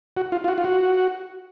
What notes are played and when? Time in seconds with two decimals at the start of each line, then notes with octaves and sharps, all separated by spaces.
0.17 F#4
0.32 F4
0.44 F4
0.48 F#4
0.58 F4
0.64 F#4